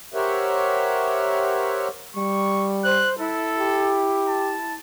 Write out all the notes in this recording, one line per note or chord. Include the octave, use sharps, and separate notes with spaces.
G4 A#4 C5 C#5 E5 F#5
G3 C#6
C5 F#6
E4 A4
G4
A5